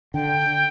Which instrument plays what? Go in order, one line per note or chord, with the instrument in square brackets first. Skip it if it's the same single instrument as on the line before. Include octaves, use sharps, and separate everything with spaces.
[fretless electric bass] D3 [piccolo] G5